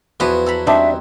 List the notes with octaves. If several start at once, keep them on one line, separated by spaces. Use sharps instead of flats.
E2 F3 B3 E4 F#4
A4 A#5 B5
G3 C4 D4 D#4 E5